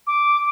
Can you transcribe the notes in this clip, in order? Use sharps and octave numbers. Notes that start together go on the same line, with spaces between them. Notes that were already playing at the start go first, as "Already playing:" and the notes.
D6